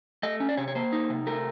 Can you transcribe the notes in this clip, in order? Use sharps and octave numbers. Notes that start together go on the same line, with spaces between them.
A3 D#5
C#4
D5
C3 C#5
C#5
A#3 C5
D#4
C3
A3 A#4